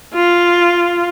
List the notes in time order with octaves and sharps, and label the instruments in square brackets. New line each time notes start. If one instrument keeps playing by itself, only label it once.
[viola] F4